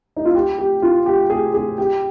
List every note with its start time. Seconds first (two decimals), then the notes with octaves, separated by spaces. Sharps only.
0.17 D#4
0.25 F4
0.35 G4
0.58 G4
0.82 F4
1.06 G4
1.30 G#4
1.54 G#4
1.78 G4